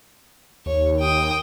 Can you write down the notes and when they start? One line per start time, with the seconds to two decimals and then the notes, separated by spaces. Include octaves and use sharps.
0.66 D#2 C#5
1.00 G5 D#6